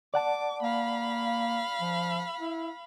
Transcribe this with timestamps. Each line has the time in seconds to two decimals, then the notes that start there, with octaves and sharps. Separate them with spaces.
0.14 D5 F#5 A5 D6
0.62 A#3 F5 B5
1.81 F3
2.40 E4